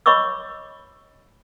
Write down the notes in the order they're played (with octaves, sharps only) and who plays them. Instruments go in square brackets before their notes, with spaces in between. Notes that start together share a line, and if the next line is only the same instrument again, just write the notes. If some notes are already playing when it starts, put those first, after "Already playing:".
[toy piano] C#5 D#5 B5 C#6 D6 E6